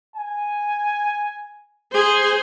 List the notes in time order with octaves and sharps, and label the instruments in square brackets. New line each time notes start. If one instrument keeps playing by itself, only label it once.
[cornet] G#5
[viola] G#4 C5